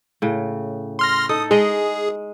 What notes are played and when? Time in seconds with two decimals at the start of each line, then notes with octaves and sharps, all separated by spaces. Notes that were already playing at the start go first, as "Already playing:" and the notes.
0.22 A2 C#3
0.99 C6 F6 A#6
1.29 D#4 A4 D#6
1.51 G#3 G#4 D#5